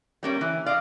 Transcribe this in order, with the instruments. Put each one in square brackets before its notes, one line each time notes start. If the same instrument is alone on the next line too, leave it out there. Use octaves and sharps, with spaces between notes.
[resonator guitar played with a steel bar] G3 A#3 C#4
E3
[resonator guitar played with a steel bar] D5 D#5 [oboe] F5